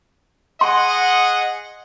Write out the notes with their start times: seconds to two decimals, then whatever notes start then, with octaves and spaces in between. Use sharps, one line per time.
0.61 G#4 D#5 F#5 C6